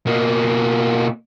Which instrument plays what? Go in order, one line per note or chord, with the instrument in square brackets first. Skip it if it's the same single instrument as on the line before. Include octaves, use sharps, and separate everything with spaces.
[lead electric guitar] B2 A#3